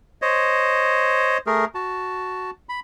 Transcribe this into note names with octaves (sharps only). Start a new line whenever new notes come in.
C5 C#5 D#5
A3 G#4 A#4
F#4 A5
B5